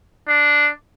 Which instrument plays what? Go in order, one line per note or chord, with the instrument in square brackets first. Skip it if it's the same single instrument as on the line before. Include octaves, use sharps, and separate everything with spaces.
[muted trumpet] D4